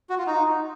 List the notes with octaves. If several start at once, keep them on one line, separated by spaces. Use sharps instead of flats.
F#4
F4
D#4